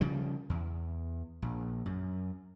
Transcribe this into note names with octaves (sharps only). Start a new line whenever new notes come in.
C#3 F3 G3
E2
A#1
F#2